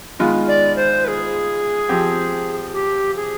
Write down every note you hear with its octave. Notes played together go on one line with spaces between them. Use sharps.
D#3 G#3 B3 F4
D5
C5
B4
G#4
F3 C4 G4
G4
G#4